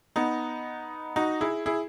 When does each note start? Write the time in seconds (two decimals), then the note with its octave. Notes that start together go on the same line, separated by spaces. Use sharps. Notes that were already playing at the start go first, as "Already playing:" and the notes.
0.16 B3 D#4
1.16 D#4 F#4
1.41 E4 G#4
1.66 E4 G#4